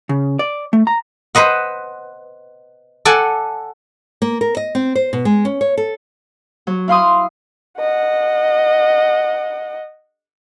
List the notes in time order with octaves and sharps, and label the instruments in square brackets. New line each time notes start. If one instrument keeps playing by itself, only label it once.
[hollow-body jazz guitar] C#3
D5
A3
A#5
[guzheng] B4 C5 D#5 F#5
A4 D5 F#5 G#5
[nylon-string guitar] A#3
A#4
D#5
C4
C5
B2
G#3
C#4
C#5
A4
[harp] F#3
E4 F5 C6 D#6
[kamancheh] D#5 F#5